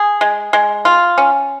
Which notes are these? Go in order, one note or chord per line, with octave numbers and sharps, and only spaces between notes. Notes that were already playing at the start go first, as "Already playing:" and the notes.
Already playing: G#4
G#3
G#3
F4
C#4